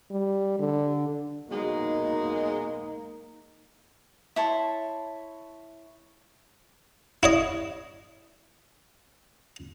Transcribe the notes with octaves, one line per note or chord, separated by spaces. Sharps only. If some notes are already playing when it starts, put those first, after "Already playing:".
G3
D3
B2 F#3 G#3 A#3 D#4
E4 C#5 A5 C6
E4 C#5 D#5